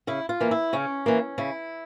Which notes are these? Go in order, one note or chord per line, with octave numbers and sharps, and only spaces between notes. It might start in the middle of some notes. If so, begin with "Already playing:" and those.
C#3 E4
F4
E3 A#3
E4
C#3 C#4
E3 A#3
C#3 E4